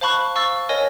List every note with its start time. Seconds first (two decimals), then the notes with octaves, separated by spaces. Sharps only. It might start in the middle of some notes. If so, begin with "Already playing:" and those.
0.01 C5 F5 A5 B5 C#6 F#6
0.35 F5 C#6 E6 A6
0.69 A#4 C#5 D#5 G#5 A#6